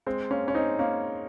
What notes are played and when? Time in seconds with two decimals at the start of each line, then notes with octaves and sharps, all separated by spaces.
0.07 G#3 C4
0.31 A#3 C#4
0.48 C#4
0.55 C4 D#4
0.79 A#3 C#4